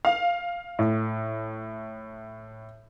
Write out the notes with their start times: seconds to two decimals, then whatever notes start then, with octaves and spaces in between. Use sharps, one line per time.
0.05 F5
0.79 A2